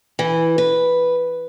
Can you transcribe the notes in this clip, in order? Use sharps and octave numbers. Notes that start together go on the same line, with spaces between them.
E3
B4